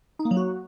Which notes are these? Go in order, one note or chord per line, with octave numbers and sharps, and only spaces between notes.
D#4
A#3
F#3
F#4